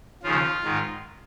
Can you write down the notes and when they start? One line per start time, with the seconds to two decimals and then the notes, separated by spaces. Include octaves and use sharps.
0.23 D#2 C#3 F3 F4
0.63 G#2 D#3